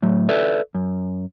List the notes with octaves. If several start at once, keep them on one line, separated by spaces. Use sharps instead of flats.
A2 F#3
A4 B4 D5 E5
F#2